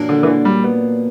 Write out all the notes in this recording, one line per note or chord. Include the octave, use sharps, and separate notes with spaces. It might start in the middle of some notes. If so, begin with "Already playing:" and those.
Already playing: A#2 F#3 A#3 D4
D3
E3
D3
G3
B3